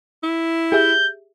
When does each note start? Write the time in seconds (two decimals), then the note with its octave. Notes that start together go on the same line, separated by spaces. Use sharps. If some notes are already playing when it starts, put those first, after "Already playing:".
0.24 E4
0.72 G4 G#4 E5 G6